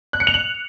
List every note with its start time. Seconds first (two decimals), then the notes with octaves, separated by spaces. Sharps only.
0.13 F#6
0.20 C#7
0.27 F7
0.34 F#7